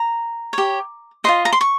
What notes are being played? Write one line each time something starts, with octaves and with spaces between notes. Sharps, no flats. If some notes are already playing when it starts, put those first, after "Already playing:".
Already playing: A#5
G4 C#5
F4 C5 D#5 C6
A#5
C6
C#6